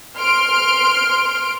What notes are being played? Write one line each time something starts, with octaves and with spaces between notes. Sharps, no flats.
C6 F6 D7